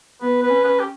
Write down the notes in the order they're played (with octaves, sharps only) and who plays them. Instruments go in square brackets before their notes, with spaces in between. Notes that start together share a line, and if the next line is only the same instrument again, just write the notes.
[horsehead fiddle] B3 [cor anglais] B4
[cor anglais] B4
[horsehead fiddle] C#4
[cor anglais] B4
G4